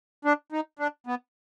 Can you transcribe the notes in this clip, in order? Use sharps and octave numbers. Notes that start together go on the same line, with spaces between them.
D4
D#4
D4
B3